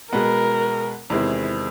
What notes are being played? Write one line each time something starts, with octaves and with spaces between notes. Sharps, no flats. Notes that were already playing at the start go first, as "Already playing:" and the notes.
B2 G#3 B3 A#4
E2 C3 D#3 G#3 C4 E4